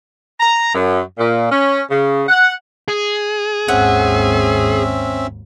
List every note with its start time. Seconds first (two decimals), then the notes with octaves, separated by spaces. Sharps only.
0.40 A#5
0.74 F#2
1.18 A#2
1.51 C#4
1.91 C#3
2.29 F#5
2.88 G#4
3.68 G#1 D#2 C4 C#4 E5 F#5